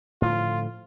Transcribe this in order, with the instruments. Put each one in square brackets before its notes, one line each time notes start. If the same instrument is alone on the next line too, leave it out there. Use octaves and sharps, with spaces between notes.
[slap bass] A2 D3 F3 [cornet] F4